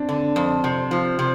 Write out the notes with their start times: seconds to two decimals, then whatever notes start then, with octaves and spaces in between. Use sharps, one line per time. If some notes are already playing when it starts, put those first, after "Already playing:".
Already playing: C4 D4
0.09 D3
0.36 F2
0.64 C3
0.91 F3
1.19 C3